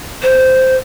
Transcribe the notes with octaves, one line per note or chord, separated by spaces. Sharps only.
C5